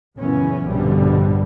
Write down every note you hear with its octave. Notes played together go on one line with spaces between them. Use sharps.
F#1 A#2 E3 B3 C#4
A#1 G2 B2 D3 G3